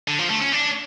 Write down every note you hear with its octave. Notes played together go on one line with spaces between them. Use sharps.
D3
F3
A3
C#4
D4